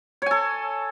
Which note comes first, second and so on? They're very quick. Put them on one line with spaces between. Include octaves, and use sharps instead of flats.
C#5 G#5 A4